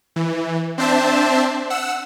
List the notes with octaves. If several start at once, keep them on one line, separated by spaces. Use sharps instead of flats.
E3
C4 D4 C5 E5 A5
F#5 E6